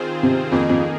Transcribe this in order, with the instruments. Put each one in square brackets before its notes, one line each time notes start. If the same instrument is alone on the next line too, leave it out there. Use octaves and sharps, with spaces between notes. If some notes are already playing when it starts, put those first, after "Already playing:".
Already playing: [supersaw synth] D#3 C4 F4 G#4 C5
[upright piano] C3
[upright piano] F2 [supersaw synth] D#3 A#3 G#4
[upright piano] F2